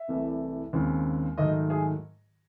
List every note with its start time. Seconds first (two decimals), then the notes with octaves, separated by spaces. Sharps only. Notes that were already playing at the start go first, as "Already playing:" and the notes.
Already playing: E5
0.08 C2 C3 E3 A3
0.73 D#2 C#3 G#3 C4
1.37 G#2 D#3 F#3 A3 D#5
1.70 G#4